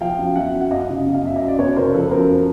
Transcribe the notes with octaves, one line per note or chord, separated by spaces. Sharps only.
F3 F5 G5
F#2
F#2 E5 F#5
F#2
F#5
F#2 D#5 F5
C#3
F#2
F5
F#2 E5
D#5
F#2
D5
F#2 B4 C#5
C#3 A#4 C5
F3 A4 B4
F#2 A#4 C5
F3